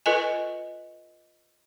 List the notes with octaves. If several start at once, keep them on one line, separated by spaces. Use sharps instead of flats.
F4 A4 B4 D#5 G#5